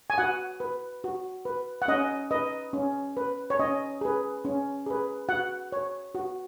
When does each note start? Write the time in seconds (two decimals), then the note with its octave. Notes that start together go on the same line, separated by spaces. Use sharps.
0.10 G#5
0.18 F#4 F#5
0.60 B4
1.04 F#4
1.45 B4
1.82 F#5
1.88 C#4 D#5
2.31 B4 D#5
2.73 C#4
3.17 B4
3.50 C#5
3.59 C#4 D#5
4.01 G#4 B4
4.45 C#4
4.86 G#4 B4
5.29 F#4 F#5
5.72 C#5
6.15 F#4